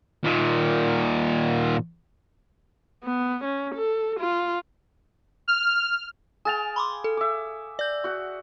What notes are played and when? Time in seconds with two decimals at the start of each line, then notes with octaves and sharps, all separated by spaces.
0.24 A#2 D#3
3.04 B3
3.44 C#4
3.75 A4
4.20 F4
5.48 F6
6.45 G#4 F5 G5 G#5 A6 F7
6.76 B5 C6 D6
7.04 A4
7.17 E5 D6
7.79 D5 G6
8.04 F#4 F#5